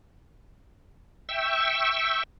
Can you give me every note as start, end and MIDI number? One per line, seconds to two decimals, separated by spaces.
1.29 2.23 76
1.29 2.23 79
1.29 2.23 85
1.29 2.23 88